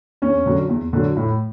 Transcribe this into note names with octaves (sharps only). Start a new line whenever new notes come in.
E2 C#4
D3 F#3
E2
D3 F#3
A2